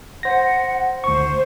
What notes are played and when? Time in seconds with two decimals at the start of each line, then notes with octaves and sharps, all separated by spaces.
0.23 C5 F#5 A#6
1.04 D2 C5 C#6